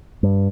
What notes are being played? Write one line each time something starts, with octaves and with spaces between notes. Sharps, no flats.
G2